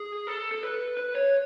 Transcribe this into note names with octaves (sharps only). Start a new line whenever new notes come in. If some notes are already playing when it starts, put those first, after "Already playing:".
Already playing: G#4
A4
A4
B4
B4
C#5